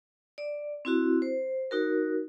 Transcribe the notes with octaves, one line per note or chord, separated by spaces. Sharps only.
D5
C4 E4 F#4
C5
D#4 F#4 A#4